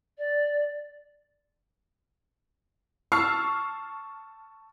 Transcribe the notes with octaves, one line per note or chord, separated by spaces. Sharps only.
D5
A5 C#6 E6 F6 C7